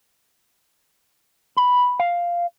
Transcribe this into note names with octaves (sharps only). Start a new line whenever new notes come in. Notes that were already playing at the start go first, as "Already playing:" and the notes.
B5
F5